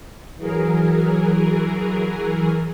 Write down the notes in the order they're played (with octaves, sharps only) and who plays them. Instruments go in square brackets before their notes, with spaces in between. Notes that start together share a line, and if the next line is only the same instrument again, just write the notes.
[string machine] E3 F#3 G#4 A#4